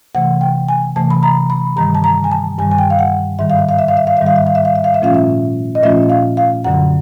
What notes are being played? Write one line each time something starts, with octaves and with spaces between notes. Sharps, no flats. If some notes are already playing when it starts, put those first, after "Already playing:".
C3 E3 A3 F#5
G5
G#5
C3 E3 A3 A5
B5
A#5
B5
G2 D#3 G3 A#5
A5
A#5
G#5
A5
G2 D#3 G3 G#5
G#5
G5
F5
F#5
G#2 D#3 G3 E5
F5
E5
F5
E5
F5
E5
F5
G#2 D#3 G3 E5
F5
E5
F5
E5
F5
E5
F5
E5
A#2 F3 A3 C#4 F4 F5
E5
D#5
A#2 F3 A3 C#4 F4 E5
F5
F5
F#2 D3 F#3 F#5